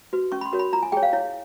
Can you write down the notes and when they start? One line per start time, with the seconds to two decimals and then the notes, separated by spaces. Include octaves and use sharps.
0.13 F#4 B4
0.32 C#4 C#6
0.41 B5
0.46 C6
0.53 F#4 A#4 C#5
0.59 B5
0.73 F4 A#5
0.83 G#5
0.92 G#4 C#5 G5
1.03 F5
1.13 E4 C#5